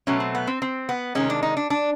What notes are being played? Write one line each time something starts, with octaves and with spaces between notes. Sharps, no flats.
B2 F#3 A3 C#4
C4
B3
C4
C4
B3
C3 D#3 G#3 C#4
D4
D#4
D4
D4